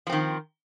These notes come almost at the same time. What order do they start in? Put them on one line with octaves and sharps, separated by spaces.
F3 C4 D#3